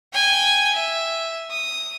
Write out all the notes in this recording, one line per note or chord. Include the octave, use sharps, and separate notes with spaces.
G5 G#5
E5
D#6